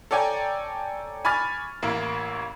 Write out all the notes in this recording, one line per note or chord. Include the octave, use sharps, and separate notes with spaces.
A4 C#5 D5 G5 G#5 A#5
G#5 B5 C#6 D6 F6 A6
A1 A#3 E4